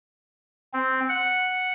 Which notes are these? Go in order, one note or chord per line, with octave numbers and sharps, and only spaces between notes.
C4
F#5